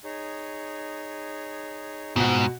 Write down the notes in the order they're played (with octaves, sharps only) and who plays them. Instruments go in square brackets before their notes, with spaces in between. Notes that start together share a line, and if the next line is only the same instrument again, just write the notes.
[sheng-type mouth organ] D#4 G#4 C#5
[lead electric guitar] G#2 [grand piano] B2 F#4 [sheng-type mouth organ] C4 F4 C5